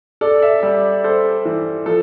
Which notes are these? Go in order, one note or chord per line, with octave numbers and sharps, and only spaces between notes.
A4 D5
E5
G3 E5
A4 C5
E3
F3 A4